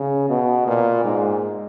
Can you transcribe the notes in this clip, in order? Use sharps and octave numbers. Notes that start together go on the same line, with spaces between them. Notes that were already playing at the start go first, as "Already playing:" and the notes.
Already playing: C#3
B2
A#2
G#2